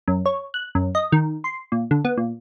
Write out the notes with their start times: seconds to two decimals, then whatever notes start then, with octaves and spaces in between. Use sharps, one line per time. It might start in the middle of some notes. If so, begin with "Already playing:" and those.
0.08 F#2
0.26 C#5
0.54 F#6
0.75 F#2
0.95 D#5
1.12 D#3
1.44 C6
1.72 A#2
1.91 D3
2.05 B3
2.17 A#2